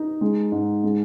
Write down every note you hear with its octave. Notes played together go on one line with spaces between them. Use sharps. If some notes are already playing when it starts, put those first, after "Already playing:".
Already playing: D#4
G#3
G#2
G#3